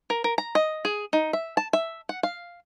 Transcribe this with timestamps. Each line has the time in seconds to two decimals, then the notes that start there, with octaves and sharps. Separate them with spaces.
0.10 A#4
0.24 A#4
0.38 A#5
0.55 D#5
0.85 G#4
1.13 D#4
1.33 E5
1.57 A5
1.73 E5
2.09 F#5
2.23 F5